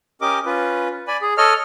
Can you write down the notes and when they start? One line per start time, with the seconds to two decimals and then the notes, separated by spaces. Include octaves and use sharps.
0.21 C#4 G4 A#4 D#5 D6
0.46 C#4 F4 B4
1.07 D5 G#5 B5
1.22 G#4
1.38 A4 C#5 D#5 F6